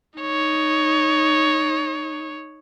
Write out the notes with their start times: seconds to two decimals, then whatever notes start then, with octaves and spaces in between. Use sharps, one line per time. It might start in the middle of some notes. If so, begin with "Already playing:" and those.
0.19 D#4 C#5